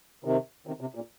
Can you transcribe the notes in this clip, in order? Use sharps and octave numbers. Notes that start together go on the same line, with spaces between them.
C3 D#3
C3 D#3
C3
A#2